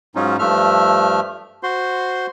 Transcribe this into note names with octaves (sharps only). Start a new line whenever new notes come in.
G#2 F#3 C#4 D#4 F4
G2 F3 A3 E5 F6
F#4 C5 C6